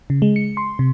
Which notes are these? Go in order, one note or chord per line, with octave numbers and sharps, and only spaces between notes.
C#3
G#3
C#7
C6
C3